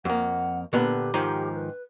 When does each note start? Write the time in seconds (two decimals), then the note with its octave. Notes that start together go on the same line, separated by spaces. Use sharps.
0.05 F2 A#3 F#5
0.73 A#2 D3 B3 G4
1.14 G#2 D#3 F3
1.54 B4